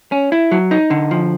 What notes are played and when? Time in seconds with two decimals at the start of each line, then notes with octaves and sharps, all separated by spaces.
0.12 C#4
0.32 E4
0.51 F#3
0.71 D#4
0.91 D3
1.11 F3